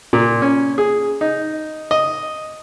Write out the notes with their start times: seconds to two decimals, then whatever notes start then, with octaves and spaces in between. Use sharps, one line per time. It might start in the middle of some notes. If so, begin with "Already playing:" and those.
0.13 A#2
0.42 C#4
0.78 G#4
1.21 D#4
1.91 D#5